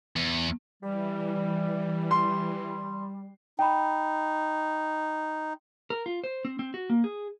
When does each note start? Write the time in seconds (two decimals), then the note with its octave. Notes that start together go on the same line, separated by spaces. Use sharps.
0.16 E2
0.83 E3 G3
2.11 C6
3.59 D#4 G5 B5
5.90 A#4
6.06 F4
6.24 C5
6.45 C4
6.59 C4
6.74 F#4
6.90 A#3
7.04 G#4